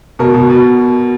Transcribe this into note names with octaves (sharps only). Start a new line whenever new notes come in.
B2 A#4
B2
B2